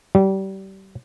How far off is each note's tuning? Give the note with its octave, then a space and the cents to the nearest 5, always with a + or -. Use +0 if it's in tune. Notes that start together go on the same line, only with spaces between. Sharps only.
G3 -30